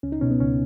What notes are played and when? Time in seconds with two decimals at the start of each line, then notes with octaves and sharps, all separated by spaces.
0.03 C#2 C#4
0.12 D#4
0.21 B2 C#4
0.31 B3
0.40 C#2 C#4